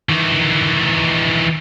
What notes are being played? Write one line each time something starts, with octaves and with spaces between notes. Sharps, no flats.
D#3 E3